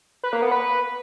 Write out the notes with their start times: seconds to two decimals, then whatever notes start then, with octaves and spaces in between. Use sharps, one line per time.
0.23 B4
0.33 A#3
0.42 B3
0.51 B4